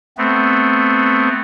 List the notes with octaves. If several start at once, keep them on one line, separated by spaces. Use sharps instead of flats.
A3 B3 C4